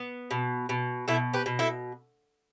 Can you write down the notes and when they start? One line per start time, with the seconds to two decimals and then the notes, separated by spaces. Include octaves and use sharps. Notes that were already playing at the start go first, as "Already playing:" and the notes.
Already playing: B3
0.31 B2
0.69 B2
1.08 B2 E4 A4
1.34 G4 B4
1.46 B2
1.59 E4 A4